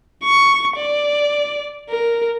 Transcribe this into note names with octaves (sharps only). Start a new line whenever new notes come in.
C#6
D5
A#4